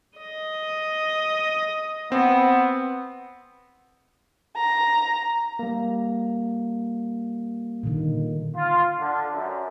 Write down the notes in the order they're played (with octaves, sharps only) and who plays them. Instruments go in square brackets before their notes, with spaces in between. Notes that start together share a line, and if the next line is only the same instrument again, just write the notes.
[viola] D#5
[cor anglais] B3 [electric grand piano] C4
[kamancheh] A#5
[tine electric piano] G3 A#3
[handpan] A#2 D3 D#3
[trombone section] F4
D3
F#2